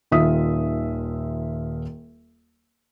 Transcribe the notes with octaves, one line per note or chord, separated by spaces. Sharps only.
D#1 D#3 F4 E5 D#6 B6